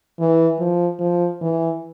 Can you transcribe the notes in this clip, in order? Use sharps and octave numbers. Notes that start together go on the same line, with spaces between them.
E3
F3
F3
E3